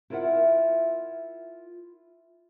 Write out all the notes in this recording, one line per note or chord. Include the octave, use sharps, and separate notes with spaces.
E4 F4 A#4 C#5 E5 F#5